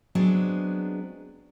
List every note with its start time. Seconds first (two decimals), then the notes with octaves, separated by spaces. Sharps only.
0.15 F#3 G#3 B3 C4 D4